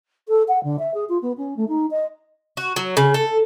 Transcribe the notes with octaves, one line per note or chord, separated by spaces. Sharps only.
A4
F#5
D3
E5
G#4
F4
B3
C#4
A3
D#4
D#5
F#4
F#3
C#3
A4